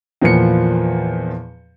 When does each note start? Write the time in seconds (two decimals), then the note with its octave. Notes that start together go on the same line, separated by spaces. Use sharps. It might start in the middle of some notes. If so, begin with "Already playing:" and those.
0.22 E2 A#2 F3 B3 C#7